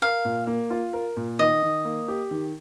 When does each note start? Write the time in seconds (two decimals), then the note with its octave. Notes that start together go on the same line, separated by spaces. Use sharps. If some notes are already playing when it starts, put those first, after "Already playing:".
0.02 A#4 F5
0.25 A#2
0.47 A#3
0.70 F4
0.93 A#4
1.17 A#2
1.39 D#3 D#5
1.62 D#3
1.85 A#3
2.08 G4
2.31 D#3